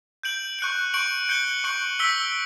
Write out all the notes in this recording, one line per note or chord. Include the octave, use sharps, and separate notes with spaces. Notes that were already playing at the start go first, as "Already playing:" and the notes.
G6 D7 F#7
C#6 F#6 C#7 F#7
C#6 G6 D7 F#7
G6 C#7 G7
C#6 F#6 C#7 F#7
E6 B6 D7 G7